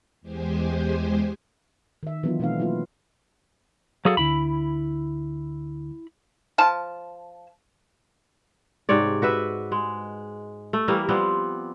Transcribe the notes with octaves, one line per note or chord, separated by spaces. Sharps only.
E2 G#3 G4 C5 G#5
D#3 E5
E3 F#3 B3 D4 D#4 F4
B2 E3 A3 C4 D#4 F5
F#3 A#3 E4 F4
F#3 F#4 G#4 A4 F5
D2 D3 E4 B5
F3 A5
G#2 C3 C#5 D5
F#4 B4 E5
G#3
A3
E3 G3 A#3
F3 G3 B3 C4